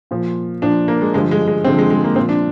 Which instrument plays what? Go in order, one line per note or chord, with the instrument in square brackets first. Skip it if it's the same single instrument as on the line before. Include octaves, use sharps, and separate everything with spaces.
[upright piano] A#2 F3
A#2 F3 D4
A#3
G#3
G2 D3 F3 G#3
G#3
G#3
G2 D3 F3 C4
G#3
G#3
A#3
A#2 F3 C4
D4